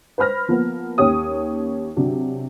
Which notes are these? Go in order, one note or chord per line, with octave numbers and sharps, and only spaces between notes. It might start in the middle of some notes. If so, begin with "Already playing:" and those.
B4 C5 B5 F6 A#6
F3 A#3 B3
D#2 C#4 G4 C#5 D#6
C3 F#3 D4